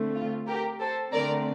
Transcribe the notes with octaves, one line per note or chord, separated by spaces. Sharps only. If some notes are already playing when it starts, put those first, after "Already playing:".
Already playing: D3 A3 C4
F4
G4 A#4
A4 C5
D3 A3 C4 A#4 D5